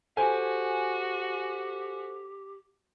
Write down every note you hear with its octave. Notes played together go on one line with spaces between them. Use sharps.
F#4 G4 A4 C5 G#5